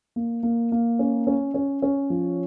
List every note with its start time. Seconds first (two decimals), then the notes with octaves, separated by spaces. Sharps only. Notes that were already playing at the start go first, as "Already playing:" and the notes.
0.16 A#3
0.43 A#3
0.72 A#3
0.99 C#4
1.27 C#4
1.54 C#4
1.82 C#4
2.10 F3